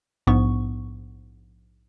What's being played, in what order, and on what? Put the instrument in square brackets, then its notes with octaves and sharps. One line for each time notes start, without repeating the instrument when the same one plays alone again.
[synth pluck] A#1 G#2 B3 C#6